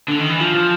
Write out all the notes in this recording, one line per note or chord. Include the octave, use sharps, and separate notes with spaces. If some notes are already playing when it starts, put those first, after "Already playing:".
D3
D#3
E3
F3
F3